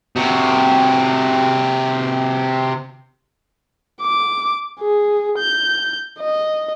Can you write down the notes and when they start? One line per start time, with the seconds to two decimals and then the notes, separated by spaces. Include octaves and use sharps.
0.16 C3 F#4
4.02 D6
4.80 G#4
5.39 G6
6.19 D#5